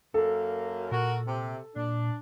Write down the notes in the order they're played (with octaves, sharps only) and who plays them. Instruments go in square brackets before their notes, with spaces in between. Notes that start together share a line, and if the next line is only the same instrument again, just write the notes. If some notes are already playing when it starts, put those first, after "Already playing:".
[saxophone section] F#2 A#3 [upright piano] A4
[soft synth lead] A#2 [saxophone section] F#4 A#4
[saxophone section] C3
[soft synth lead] A#2 [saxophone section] D4